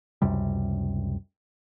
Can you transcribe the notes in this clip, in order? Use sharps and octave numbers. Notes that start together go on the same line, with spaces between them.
C#2 F#2 C3 G3